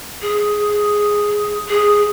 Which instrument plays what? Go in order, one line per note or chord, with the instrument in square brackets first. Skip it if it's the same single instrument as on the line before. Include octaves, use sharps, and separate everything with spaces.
[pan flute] G#4
G#4